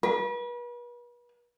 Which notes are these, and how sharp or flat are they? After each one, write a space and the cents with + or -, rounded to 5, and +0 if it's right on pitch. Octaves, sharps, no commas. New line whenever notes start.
B4 -40